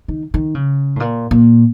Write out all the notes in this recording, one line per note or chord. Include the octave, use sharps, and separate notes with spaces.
D#3
D#3
C#3
A2
A#2
A#2